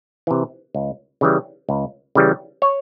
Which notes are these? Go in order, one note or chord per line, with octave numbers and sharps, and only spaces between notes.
C3 E3
C#2
C#3 E3 G3
C#2
C#3 E3 G3
C#5